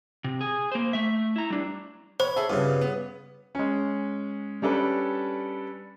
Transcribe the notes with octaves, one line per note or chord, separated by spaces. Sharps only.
C3
G#4
A#3 C5
A3 E5
E4 A#5
G3 D4
C5 C#5 B5
G#4 A4 E5
G2 C#3 B3 F4
B3
G#3 C#4
G3 C#4 D4 A4 B4